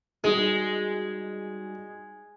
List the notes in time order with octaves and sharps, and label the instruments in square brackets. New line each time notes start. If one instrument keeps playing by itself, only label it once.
[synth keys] G3 D#4 F#4 [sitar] G#3 [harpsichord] G#4